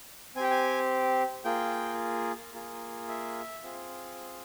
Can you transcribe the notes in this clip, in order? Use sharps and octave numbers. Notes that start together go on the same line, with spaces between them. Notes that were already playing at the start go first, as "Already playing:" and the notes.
C4 G4 G5 G#5
G#5
A#3 F4 G#4 G5
A#3 F4 G#4
E5
C4 F4 G#4